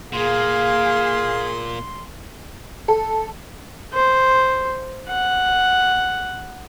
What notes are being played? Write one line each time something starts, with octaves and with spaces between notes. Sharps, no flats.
A#2 A#3 G#4 F5 C6
A4
C5
F#5